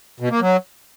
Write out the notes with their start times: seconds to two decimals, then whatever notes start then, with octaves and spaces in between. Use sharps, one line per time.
0.20 B2
0.30 A#3
0.40 F#3